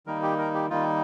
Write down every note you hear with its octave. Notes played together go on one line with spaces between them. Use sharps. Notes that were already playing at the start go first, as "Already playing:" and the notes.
D#3 G3 A#3 D#4 A#4
G4
A#4
G4
D#3 G3 A#3 D#4 F4